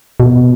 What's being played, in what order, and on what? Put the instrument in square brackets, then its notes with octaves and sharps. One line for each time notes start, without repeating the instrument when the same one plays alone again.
[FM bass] B2